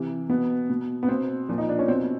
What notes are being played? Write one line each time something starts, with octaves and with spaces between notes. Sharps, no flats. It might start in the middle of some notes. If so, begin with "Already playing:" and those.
Already playing: C3 E3
B2 B3
B2
B3
B2 C4
A#2 F3
D#4
D4
C#4
B2 C4